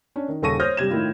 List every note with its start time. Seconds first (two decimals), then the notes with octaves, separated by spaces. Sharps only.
0.16 C#4 D4
0.28 D#3
0.42 D#1 C#3 A4 C#6 A#6 D#7
0.60 C5 C#5 D#6 F6 G6 A#6
0.77 G2 C3 G#6 E7
0.90 A2 D#3 E4 F4